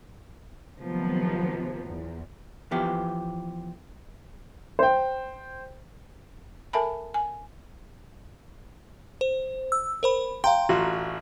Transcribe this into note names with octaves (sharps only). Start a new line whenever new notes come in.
C3 D#3 F3 F#3 A3 B3
E2
E3 F3 B3 G4
C5 G5
A4 A#4 E5 G#5 A5 B5
G#5
C5
E6
A#4 C5 B5
F5 G5 A#5 C6
A1 F4 F#4